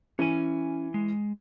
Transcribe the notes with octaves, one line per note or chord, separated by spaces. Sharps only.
E3 C#4 G#5
G#3